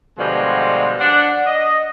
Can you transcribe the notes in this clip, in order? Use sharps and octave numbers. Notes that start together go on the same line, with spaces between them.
B2 D3 F3 G3 G#3 F#4
D4 F#5
D#5